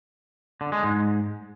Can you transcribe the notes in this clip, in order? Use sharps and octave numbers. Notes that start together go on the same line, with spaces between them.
D3
G#3
G#2